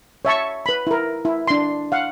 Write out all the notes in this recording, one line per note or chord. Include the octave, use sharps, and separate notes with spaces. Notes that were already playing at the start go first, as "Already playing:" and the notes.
C#5 E5 A5 C#6
B4 B5
E4 A#4
E4
D4 C6
F5 F#5